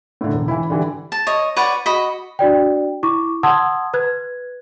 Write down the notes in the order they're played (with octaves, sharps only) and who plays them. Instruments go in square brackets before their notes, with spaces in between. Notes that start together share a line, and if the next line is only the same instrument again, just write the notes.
[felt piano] A2 D3
E1
E3 E4
D3 E3 G3
[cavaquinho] A5
C#5 D#5
B4 C#5 D5 F#5
F#4 D#5 B5
[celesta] D4 F#4 D5 G5
E4 C#6 D6
F#5 A5 C6 D#6 E6 G#6
B4 F#6 G#6